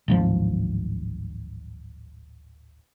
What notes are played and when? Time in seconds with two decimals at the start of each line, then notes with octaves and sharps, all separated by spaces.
0.08 D1 G#1 F3